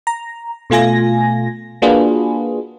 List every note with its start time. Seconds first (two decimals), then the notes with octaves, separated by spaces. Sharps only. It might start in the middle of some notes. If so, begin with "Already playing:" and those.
0.07 A#5
0.70 B2 A3 F4 G#5 A#6
1.82 A#3 D4 F4 F#4 G#4 B4